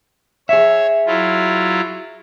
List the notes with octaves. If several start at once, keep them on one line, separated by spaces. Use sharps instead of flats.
G#4 C#5 E5
F#3 E4 F4